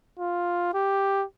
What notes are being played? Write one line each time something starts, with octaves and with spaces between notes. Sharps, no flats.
F4
G4